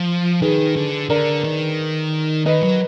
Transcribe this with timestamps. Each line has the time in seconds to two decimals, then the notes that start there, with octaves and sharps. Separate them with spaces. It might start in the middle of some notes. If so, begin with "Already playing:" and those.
Already playing: F3
0.42 D#3 G#4 B4
0.76 D3
1.10 D3 A#4 D5
1.44 D#3
2.46 D#3 B4 D#5
2.63 F#3